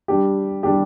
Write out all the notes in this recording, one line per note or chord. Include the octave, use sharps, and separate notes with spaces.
G3 D4 G4
G3 D4 G4